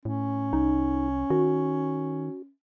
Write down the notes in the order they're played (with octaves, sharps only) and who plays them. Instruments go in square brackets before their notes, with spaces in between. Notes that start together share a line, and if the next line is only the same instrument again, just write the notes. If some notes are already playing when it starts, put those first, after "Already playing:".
[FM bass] A2 [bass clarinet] C#4
[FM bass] C2 [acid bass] D#4
[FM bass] D#3 [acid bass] F#4